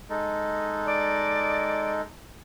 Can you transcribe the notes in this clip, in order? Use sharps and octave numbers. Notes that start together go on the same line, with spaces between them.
G#3 D#4 A4
D5